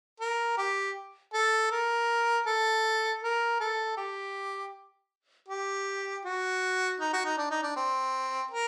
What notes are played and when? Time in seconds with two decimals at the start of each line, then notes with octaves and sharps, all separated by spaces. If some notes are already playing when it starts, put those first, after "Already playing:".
0.20 A#4
0.57 G4
1.33 A4
1.71 A#4
2.46 A4
3.23 A#4
3.60 A4
3.97 G4
5.49 G4
6.25 F#4
7.00 D#4
7.13 F#4
7.25 D#4
7.38 D4
7.51 D#4
7.63 D4
7.76 C4
8.51 A#4